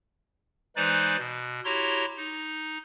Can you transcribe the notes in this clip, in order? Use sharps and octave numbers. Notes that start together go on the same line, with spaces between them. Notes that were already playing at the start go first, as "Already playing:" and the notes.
E3 G#3 D#4 B4 C5 D5
B2
E4 F#4 G4 C#5 A#5 C6
D#4